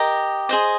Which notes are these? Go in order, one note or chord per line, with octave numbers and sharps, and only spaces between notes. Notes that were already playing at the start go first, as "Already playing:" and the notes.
Already playing: G4 A#4 D#5
G#4 C5 D#5